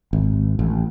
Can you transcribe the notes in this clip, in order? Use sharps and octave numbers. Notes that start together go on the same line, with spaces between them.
G#1
A1